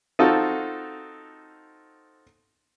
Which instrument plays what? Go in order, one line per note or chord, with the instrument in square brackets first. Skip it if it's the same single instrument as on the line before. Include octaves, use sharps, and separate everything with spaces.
[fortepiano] C4 D#4 F4 F#4 A4